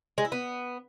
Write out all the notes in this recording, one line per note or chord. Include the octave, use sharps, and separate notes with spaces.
G#3
E4
B3